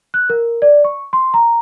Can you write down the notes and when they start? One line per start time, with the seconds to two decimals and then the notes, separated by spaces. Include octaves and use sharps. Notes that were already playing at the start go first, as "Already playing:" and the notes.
0.14 F#6
0.30 A#4
0.62 D5
0.85 C#6
1.13 C6
1.34 A#5